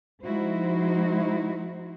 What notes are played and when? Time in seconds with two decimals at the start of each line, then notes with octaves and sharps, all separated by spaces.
0.23 F3 G#3 D#4 E4 F#4 C5